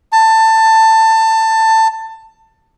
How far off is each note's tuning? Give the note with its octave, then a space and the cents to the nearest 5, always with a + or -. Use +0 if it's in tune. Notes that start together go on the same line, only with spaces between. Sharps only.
A5 +20